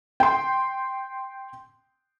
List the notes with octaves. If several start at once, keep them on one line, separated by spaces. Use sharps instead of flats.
G5 C6